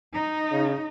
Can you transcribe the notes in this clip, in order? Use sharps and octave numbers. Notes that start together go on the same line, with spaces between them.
D#4
C#3